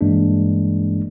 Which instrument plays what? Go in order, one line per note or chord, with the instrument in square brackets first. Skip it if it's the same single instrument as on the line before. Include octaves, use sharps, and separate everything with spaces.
[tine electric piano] G2 E3 G#3 A#3 D4